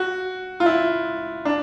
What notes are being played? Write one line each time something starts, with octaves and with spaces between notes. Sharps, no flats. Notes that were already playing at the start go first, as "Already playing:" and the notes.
Already playing: F#4
F4
E4
D4